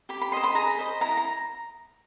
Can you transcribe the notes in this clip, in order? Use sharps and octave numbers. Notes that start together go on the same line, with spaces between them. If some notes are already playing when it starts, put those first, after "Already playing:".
G4 B5
B5
C5 D#5 C6
B5
G#4 A#5
B5
C5 D#5
E4 A#5
A#5